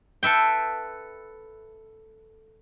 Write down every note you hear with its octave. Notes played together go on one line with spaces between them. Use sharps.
A4 B4 E5 G5